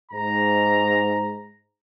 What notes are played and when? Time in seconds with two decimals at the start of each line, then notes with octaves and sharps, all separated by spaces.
0.12 G#2 A#5